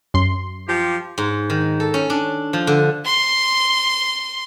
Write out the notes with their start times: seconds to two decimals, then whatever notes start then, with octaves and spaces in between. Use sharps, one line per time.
0.14 F#2 C6
0.68 F3 F4 G4
1.18 G#2
1.50 D#3
1.80 A4
1.94 C#4
2.10 D4
2.53 F3
2.67 D3
3.05 C6